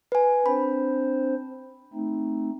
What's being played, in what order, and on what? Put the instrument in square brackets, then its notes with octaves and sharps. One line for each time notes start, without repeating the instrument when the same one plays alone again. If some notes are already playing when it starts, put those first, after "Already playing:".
[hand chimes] B4 G#5
[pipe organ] C4 D4 C5 [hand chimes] B5
[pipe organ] A3 C4 D#4